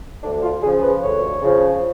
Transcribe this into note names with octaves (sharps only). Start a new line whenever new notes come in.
D2 D4
F4
C#3 F3 G#4
B4
D2 C#5
C#3 F3